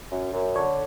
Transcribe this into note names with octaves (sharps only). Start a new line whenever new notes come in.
F#2
F#2
D3 C#5